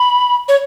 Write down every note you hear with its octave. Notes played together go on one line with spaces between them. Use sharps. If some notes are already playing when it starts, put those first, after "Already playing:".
Already playing: B5
C#5